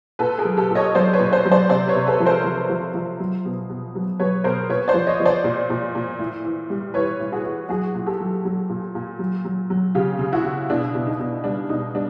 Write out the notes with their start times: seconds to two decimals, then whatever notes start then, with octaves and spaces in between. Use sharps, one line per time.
0.19 A#2 A4 B4
0.38 G#4 A#4
0.45 F#3
0.57 G4 A4
0.70 A#2
0.75 C#5 D#5
0.95 F#3 C5 D5
1.13 B4 C#5
1.20 A#2
1.32 C5 D5
1.45 F#3
1.51 C5 D5
1.69 C3 C5 D5
1.88 B4 C#5
1.95 C3
2.07 A4 B4
2.20 F3
2.26 A#4 C5
2.44 F3
2.70 F3
2.94 F3
3.20 F#3
3.45 B2
3.69 B2
3.95 F#3
4.19 F#3 B4 C#5
4.44 B2 A#4 C5
4.69 A#2 B4 C#5
4.88 C5 D5
4.94 F3
5.07 C#5 D#5
5.20 F3
5.25 C5 D5
5.44 A#2
5.70 A#2
5.95 A#2
6.19 A2
6.45 E3
6.70 G3
6.94 E3 B4 C#5
7.19 A2
7.32 F#4 G#4
7.44 E3
7.69 F#3 F#4 G#4
7.94 A#2
8.06 G4 A4
8.20 F#3
8.45 F#3
8.69 A#2
8.95 A#2
9.19 F#3
9.45 F#3
9.70 F#3
9.95 C#3 F4 G4
10.19 C#3
10.33 E4 F#4
10.44 C#3
10.69 B2 D4 E4
10.95 B2
11.07 D#4
11.20 B2
11.44 G3 D4
11.69 B2 D#4
11.94 G3 D4